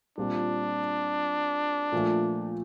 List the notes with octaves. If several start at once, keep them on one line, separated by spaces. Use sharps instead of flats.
A#2 G3 C4 D4 F4
A#2 F3 A3